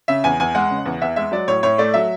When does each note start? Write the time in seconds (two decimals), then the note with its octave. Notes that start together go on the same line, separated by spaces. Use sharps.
0.08 C#3 E5
0.24 E2 G#5
0.40 E2 G#5
0.55 G#3 F#5
0.70 C#3
0.86 E2
1.02 E2 E5
1.16 G#3 E5
1.32 F#3 D5
1.48 A2 C#5
1.63 A2 C#5
1.78 A3 D5
1.94 F#3 E5